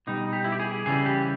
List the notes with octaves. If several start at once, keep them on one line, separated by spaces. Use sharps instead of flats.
B2 G3 D#4
G4
E4
G4
G#4
C#3 E3 G3 G#4
G4